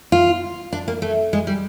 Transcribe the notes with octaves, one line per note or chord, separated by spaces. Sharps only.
F4
D4
A#3
A3
G#3
G3